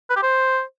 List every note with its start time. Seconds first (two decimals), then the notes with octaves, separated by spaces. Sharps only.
0.10 B4
0.16 G4
0.23 C5